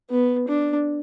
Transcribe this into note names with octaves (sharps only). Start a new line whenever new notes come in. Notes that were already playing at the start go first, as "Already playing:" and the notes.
B3
D4